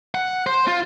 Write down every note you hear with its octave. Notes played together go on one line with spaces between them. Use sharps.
F#5
C5
F4